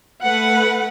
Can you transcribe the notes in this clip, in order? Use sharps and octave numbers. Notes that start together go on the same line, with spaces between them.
A3 B4 F#5